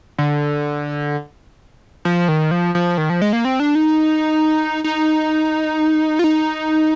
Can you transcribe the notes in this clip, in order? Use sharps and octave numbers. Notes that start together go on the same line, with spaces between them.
D3
F3
D#3
F3
F3
D#3
F3
G#3
A#3
C4
D4
D#4
D#4
F4
D#4